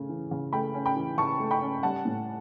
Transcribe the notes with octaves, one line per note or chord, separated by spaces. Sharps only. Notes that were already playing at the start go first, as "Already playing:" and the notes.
Already playing: C#3 A3 C#4
E3
C#3
A3 G5 B5
C#4
G5 B5
E3
C#3 A5 C#6
A3
G5 B5
C#4
G3 F#5 A5
A2